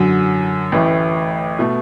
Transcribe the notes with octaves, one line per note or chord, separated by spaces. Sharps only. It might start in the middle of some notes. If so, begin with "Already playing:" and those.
Already playing: F#2 D3 F#3
A1 A2 E3 A3
B2 A3